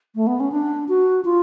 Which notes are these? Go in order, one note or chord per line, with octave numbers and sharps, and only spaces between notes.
A3
B3
C#4
D4
F#4
F4